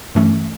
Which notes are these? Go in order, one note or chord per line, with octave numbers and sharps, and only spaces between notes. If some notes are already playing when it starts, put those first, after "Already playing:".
G2 E3 A3 C#4